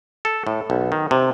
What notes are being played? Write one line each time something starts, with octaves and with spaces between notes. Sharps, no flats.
A4
A2
B1
D#3
C3